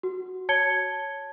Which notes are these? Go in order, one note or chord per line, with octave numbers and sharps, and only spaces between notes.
F#4
C#5 A5 G#6 C#7 G7